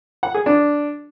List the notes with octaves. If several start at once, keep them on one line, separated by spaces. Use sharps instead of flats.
F#5
G#4
D4